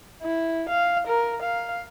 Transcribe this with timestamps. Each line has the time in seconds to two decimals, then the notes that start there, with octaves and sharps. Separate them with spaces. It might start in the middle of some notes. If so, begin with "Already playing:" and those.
0.22 E4
0.69 F5
1.07 A#4
1.42 F5